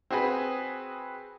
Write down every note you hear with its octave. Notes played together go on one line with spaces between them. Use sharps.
C4 F#4 G#4 B4